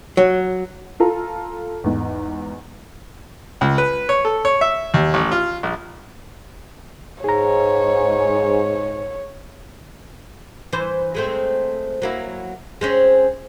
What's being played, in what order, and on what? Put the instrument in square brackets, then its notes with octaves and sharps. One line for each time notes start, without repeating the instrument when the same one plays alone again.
[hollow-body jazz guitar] F#3
[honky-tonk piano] F4 A4 F5 A#5
E2 G#2
[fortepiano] C#2
B4
C#5
A4
C#5
E5
D#2
A1
F4
A#1
[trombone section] G#2 [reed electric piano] G#4 A#5 [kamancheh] C#5
[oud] E3 C5
G#3 A3 C4
F#3 A#3 E4
G#3 C4 C#4